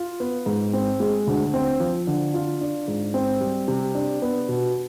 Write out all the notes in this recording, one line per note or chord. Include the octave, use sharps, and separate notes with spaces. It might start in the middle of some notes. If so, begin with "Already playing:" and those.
Already playing: F4
B3
G#2
C4
G#3
D2
C4
F3
D3
F4
D4
G#2
C4
G3
C3
D4
B3
B2